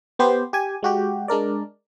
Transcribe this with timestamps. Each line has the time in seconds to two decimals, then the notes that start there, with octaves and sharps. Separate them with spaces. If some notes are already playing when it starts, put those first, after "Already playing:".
0.19 B3 G4 C5
0.53 G4 G#5
0.83 G#3 F#4 G4
1.28 G#3 D4 A#4 D5